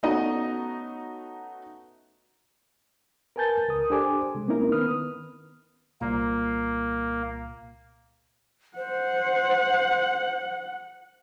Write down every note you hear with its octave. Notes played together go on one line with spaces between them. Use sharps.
A3 B3 C#4 D#4 F#4 D#5
A#4 B4 G#5 A5 G6 A6
C#2 A#4 D#6
D4 G4 A4 C5 G#5 D6
C3 G#3
A#3 C4 C#4 D#4 E4 A#4
D#3 B3 B4 D#6 F6
C2 A#2 A#3
C5 F#5